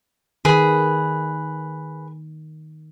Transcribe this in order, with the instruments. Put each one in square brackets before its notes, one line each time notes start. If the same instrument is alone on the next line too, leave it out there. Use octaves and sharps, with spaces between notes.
[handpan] D#3 [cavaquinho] G#4 B4